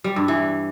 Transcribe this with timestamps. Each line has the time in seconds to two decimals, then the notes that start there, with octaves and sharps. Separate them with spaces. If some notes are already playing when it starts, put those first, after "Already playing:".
0.04 G3
0.16 G2
0.28 E3